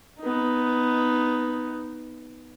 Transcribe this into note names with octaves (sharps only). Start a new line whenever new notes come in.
B3 D#4